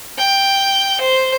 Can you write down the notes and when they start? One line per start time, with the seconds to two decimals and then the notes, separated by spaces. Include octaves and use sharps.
0.18 G5
1.01 C5